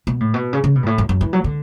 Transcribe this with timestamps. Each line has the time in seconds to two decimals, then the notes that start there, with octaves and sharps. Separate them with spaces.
0.07 B2
0.20 A2
0.34 B2
0.53 C#3
0.64 C#3
0.76 B2
0.83 G2
0.86 A2
0.98 F#2
1.09 F#2
1.21 E3
1.33 F#3
1.44 D3